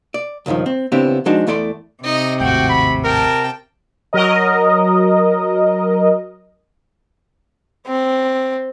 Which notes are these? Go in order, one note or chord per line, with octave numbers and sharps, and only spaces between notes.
D5
C#2 G2 C3 D#3 F3
C4
C#3 B3 C4 D4 E4 G4
F3 G#3 D4 D#4 F#4 A5
E2 A3 E4 A4 D5 C6
C3 D#4 D#5
G#1 D#2 A2 F#4 F#5 G5
B5
A#4 G5 A5
F#3 A#4 D#5
C4